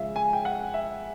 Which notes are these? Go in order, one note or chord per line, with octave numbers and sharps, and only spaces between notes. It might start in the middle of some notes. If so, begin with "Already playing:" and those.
Already playing: C#3 F3 G#3 E5 F5
G#5
G5
F#5
E5